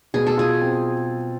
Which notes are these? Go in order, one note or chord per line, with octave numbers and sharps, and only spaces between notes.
B2 G#4
A4
F4 G#4
C4